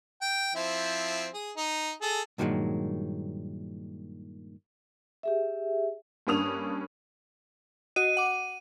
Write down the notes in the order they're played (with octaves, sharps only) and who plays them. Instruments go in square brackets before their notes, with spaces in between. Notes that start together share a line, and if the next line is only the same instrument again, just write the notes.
[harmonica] G5
F3 C4 E4
G#4
D#4
G#4 A4
[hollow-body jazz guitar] G2 A#2 D#3 E3 F#3 G#3
[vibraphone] G4 G#4 E5
[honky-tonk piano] G2 A#3 C#4 D4 D#6 F7
[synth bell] F#4 D#5 [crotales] D#7
[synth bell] F#5 D6